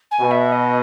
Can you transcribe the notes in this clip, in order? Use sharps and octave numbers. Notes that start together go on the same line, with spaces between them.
G#5
B2
E5
D#5